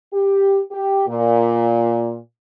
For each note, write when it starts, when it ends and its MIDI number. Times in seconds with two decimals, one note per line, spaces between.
0.13 0.61 67
0.71 1.03 67
1.08 2.16 46